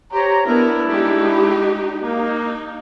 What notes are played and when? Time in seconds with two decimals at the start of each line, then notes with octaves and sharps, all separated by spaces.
0.12 G4 C5 C#5 A#5
0.45 B3 D4 E4 A#4
0.89 G#3 D#4 G4
2.02 A#3 D#4